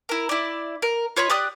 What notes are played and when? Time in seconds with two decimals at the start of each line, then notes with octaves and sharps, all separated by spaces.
0.09 E4 A#4
0.29 E4 D5
0.82 A#4
1.16 F4 C#5 D#5 B5
1.30 G4 D5 D#6 F#6